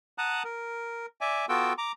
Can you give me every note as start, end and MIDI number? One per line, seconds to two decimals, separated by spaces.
0.18 0.43 78
0.18 0.43 81
0.18 0.43 82
0.18 0.43 87
0.18 0.43 90
0.44 1.06 70
1.21 1.46 74
1.21 1.46 76
1.21 1.46 80
1.49 1.73 59
1.49 1.73 65
1.49 1.73 66
1.49 1.73 69
1.49 1.73 79
1.49 1.73 88
1.78 1.92 82
1.78 1.92 86